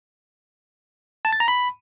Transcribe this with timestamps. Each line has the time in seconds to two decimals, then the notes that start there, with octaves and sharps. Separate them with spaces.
1.25 A5
1.33 A6
1.40 A#5
1.48 B5